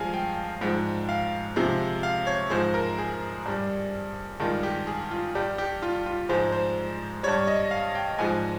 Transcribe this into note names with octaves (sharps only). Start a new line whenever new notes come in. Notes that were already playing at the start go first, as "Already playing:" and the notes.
Already playing: G2 F3 G#3 F5 G#5
G5
G#2 F3 G#3
F5
C3 F3 G#3
F5
C#5
G#2 F3 G#3 C5
A#4
G#4
G2 G3
G2 D#3 G#3 F4
G4
G#4
F4
G2 G3 G4
G4
F4
F4
G#2 F3 G#3 C5
C5
G2 G3 C#5
D#5
F5
G5
G#2 F3 G#3 G#5